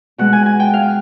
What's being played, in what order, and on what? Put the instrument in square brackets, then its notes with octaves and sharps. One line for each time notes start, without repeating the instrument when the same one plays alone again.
[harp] B2 G#3 F#5
G#5
G#5
G5
F5